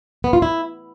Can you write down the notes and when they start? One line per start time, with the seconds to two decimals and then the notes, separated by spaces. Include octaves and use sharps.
0.24 B3
0.33 F4
0.42 E4